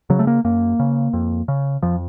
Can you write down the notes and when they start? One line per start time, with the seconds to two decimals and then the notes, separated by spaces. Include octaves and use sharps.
0.10 C#3 F#3
0.19 A3
0.27 A#3
0.45 F#2 A#3
0.79 C#3
1.13 F2
1.48 C#3
1.83 F2 F3